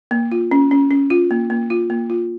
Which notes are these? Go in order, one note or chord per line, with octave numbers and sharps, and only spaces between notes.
A#3
F4
C#4
C#4
C#4
F4
A#3
A#3
F4
A#3
F4